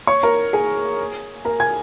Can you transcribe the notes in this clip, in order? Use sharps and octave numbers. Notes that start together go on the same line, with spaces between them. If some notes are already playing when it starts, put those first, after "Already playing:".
C#5 C#6
A#4 A#5
G#4 G#5
A#4 A#5
G#5 G#6